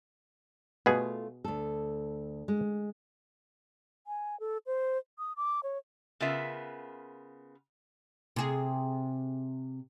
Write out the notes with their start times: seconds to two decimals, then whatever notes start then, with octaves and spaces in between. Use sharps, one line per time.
0.86 B2 A3 B3 F4 G#4
1.45 D2 A4
2.48 G#3
4.07 G#5
4.40 A4
4.66 C5
5.19 D#6
5.37 D6
5.63 C#5
6.20 C#3 B3 F4 A#4 E5
8.36 C3 G#4